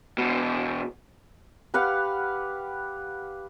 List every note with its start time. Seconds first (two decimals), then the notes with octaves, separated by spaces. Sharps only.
0.18 E2 B2
1.74 G4 B4 F5 F#5